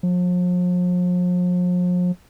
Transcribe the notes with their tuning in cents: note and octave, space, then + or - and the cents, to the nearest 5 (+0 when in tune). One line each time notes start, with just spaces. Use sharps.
F3 +40